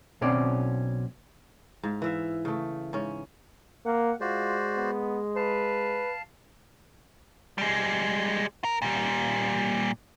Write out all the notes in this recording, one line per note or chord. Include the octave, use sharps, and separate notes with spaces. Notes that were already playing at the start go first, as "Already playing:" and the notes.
B1 B2 C4 C#4 D5
G#2 F5
E3 E5 F5
C#3 A3
G#2 C#4
A#3 F#5
G#3 F4 F#4 C5 D5
B3
B4 F5 A5
G3 G#3
A#4
A#2 G3